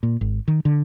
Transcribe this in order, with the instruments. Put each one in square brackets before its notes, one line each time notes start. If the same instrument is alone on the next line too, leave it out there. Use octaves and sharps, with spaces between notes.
[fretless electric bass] A#2
G#1
D#3
D3